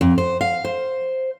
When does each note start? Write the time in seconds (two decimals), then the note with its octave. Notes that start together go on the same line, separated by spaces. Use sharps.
0.01 F2
0.18 C5
0.41 F5
0.65 C5